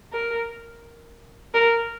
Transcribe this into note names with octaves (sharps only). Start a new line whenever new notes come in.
A#4
A#4